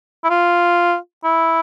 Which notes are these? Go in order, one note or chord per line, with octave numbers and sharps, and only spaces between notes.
E4
F4
E4